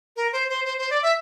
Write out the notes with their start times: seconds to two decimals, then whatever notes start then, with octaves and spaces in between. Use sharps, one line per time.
0.16 A#4
0.33 C5
0.49 C5
0.65 C5
0.78 C5
0.90 D5
1.02 E5